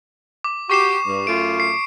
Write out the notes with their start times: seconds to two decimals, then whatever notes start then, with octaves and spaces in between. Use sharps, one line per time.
0.44 D6
0.70 F#4 G4 C#6 C7 E7
1.07 G2
1.27 F#2 A3 F4 D7
1.60 C7